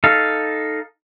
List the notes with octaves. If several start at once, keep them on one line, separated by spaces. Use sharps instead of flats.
D#4 A4 F5